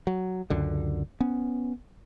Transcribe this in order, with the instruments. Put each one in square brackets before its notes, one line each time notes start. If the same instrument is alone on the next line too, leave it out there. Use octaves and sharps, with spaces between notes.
[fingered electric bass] F#3
C#2 F#2 D3
B3 C#4